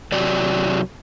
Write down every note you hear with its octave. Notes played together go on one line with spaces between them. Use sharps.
C3 F#3 D5